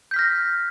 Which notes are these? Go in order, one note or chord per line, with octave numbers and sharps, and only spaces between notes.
F6 G6 A#6 B6